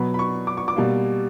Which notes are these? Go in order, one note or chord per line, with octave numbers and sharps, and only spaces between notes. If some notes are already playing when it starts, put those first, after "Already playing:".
Already playing: B2 F#3 B3 B5
B5
C#6
D6
C#6
D6
B2 G3 A#3